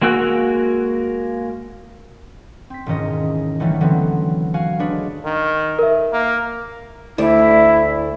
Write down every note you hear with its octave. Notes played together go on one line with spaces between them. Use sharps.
G#3 A#3 F#4 F#5 E6
C4 B6
E1 G#2 D#3 C#4 D#5
D3 E3 F#3 G3 A3 C#4
D3 E3 F#3 B3 C4
F#4 F5 G#5
G#3 D4 B4 C#5
D#3
A#4 E5
A#3
D2 A3 E4 D5